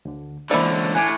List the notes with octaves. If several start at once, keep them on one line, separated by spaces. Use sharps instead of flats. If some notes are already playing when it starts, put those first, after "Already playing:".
D2 D3
C#2 D3 E3 A#3 E4 C5 D5
A2 G#5 D6 F#6